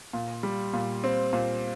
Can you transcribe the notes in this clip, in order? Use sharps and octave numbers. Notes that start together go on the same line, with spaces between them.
A#2
G3
A#2
C4
A#2